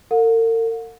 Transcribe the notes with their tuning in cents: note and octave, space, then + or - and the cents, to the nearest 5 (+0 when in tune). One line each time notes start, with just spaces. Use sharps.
A#4 -45 F#5 -45